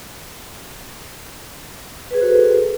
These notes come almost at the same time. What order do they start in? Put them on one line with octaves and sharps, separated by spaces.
B4 G#4 C5 F#4 A4